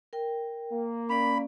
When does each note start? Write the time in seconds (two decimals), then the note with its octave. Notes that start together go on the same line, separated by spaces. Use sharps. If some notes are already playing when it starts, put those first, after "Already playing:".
0.13 A#4 G5
0.72 A#3
1.10 C#4 D5 B5